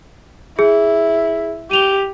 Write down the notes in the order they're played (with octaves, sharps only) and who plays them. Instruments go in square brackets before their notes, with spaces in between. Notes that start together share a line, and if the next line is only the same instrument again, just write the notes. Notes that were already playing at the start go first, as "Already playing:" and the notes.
[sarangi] E4 [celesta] G#4
[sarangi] G4 [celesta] D#7 F7 G7